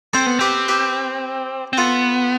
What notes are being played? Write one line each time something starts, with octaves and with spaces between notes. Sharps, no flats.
C4 A4 C5
B3
C4 G4 B4
G4 B4
C4
B3 F4 A4